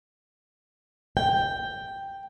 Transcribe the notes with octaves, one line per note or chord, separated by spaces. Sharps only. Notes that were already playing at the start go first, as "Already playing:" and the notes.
G5